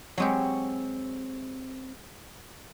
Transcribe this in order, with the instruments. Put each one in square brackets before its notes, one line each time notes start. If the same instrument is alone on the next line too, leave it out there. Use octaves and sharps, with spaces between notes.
[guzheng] F#3 G#3 G4 [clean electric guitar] C4 C#5